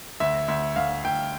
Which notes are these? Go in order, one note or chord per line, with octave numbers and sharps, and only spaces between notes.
D2 E5
D2 E5
D2 F5
D2 G5